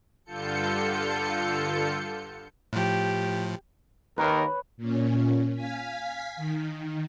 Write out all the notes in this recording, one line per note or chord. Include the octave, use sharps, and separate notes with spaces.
G2 D3 F4 A4 G6 C#7
A2 F3 G4
D#2 A#4 B4 C#5
A#2 C#4
F5 G#5 B6
D#3